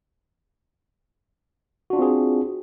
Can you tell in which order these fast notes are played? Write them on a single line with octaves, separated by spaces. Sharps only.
F#4 D4 F4 C4 G#4